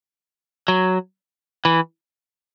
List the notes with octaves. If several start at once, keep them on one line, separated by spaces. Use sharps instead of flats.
F#3
E3